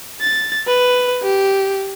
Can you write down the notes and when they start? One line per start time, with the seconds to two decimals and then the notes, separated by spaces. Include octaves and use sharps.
0.21 A6
0.68 B4
1.23 G4